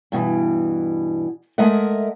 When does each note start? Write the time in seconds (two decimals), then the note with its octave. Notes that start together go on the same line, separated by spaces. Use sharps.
0.12 G2 B2 D#3 E3
1.58 G#3 A3 A#4 D#5 E5 F#5